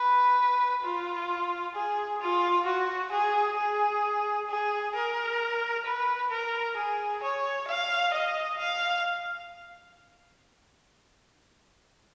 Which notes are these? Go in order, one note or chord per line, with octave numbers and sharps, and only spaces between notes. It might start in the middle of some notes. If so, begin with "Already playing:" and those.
Already playing: B4
F4
G#4
F4
F#4
G#4
G#4
G#4
A#4
B4
A#4
G#4
C#5
F5
D#5
F5